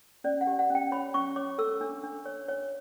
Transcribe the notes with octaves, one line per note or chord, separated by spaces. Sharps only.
C#4 D5
F#5
G4
F#5
C#4
G5
C#5 B5
C#4 C#6
C#5 D6
A4 E6
D4
D4
C#5
C#5